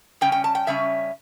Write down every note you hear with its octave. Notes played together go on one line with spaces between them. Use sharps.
C#3 G3 C#4 G5
G5
A5
G5
C#3 G3 C#4 E5